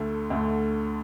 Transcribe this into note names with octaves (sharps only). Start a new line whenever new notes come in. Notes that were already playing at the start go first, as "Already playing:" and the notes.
Already playing: D2 D3 A3
D2 D3 A3